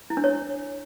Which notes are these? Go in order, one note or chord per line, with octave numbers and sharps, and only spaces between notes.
E4
D4
C#5